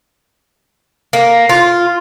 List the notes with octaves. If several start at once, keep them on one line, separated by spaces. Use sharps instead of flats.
A#3
F4